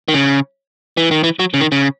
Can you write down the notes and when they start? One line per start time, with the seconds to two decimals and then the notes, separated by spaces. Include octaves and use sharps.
0.08 D#3
0.14 C#3
0.97 E3
1.11 D#3
1.24 E3
1.39 F#3
1.54 C#3
1.61 D#3
1.72 C#3